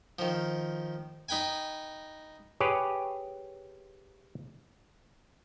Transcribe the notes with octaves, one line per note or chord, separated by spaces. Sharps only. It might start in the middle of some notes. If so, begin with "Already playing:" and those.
D#3 F3
D#4 B4 G5 G#5
G4 G#4 B4 C#5